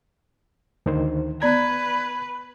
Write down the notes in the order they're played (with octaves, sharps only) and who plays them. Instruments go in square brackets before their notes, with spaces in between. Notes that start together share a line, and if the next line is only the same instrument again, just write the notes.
[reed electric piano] D2 D#3 C5
[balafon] B3 D5 A#5 [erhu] B4 [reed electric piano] G#6